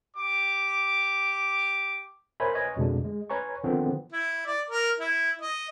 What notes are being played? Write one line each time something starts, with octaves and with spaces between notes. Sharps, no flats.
G4 D6
A#4 C5 C#5 E5 G#5 B5
B4 C#5 D#5 G#5
F2 B2 D3 G#3 D4
G#3
B4 C#5 G#5 A#5 C#6
D3 D#3 F3 B3 C4
E4
D5
A#4
E4
D#5